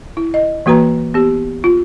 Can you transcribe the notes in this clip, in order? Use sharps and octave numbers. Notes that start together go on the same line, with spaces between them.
E4
D#5
E3 A#3 F#4 B4 A#5
B3 G4
F4